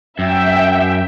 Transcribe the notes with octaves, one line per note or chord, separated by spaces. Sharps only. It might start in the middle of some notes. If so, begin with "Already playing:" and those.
F#2 E5 G5